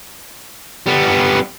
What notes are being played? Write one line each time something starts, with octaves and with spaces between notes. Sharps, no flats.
G3 B3